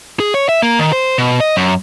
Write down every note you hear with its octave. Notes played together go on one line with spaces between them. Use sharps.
G#4
C#5
E5
A#3
D#3
C5
B2
D#5
F#2